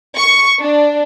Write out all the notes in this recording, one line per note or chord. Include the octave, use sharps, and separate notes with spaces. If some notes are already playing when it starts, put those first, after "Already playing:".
C#6
D4